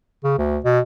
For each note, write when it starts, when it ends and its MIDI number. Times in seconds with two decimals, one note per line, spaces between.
0.24 0.36 49
0.38 0.59 38
0.64 0.80 47